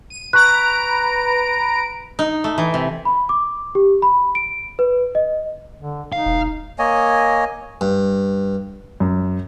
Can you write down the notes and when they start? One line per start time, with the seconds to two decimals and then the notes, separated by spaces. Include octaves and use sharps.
0.10 D#7
0.33 B4 A#5 C#6 F#6 D7
2.19 D#4
2.44 A3
2.58 E3
2.74 C3
3.05 B5
3.29 D6
3.75 G4
4.02 B5
4.35 D7
4.79 B4
5.15 D#5
5.80 D3
6.13 D#4 F5
6.26 E1
6.79 A#3 C#5 D#5 G#5
7.81 G2
9.00 F#2